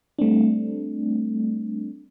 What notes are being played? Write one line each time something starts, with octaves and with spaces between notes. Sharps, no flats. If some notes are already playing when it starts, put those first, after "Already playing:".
G3 A3 C4 D4